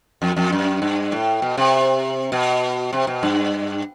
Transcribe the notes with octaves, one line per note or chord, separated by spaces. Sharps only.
F2
F2
F#2
G2
A2
B2
C3
B2
C3
B2
G2